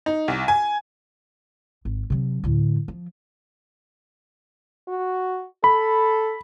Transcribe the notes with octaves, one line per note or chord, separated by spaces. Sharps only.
D#4
C2
G#5
G#1
C3 F#3
D2 A2
F3
F#4
A4 B5